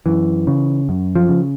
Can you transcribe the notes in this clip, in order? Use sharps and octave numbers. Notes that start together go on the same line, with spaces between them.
F#2 E3
C#3
F#2
F3
C#3